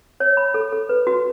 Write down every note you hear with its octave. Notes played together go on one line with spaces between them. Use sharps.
C#5
B5
A4
A4
B4
F#4